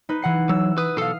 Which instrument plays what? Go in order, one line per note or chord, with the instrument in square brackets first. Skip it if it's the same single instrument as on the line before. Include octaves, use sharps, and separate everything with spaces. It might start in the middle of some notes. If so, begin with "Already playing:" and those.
[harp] D#4 B4
E3 F#5 C7
[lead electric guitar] F#3 [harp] E6
[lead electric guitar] B4 [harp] D#6
[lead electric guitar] B1 A4 [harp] F5 C7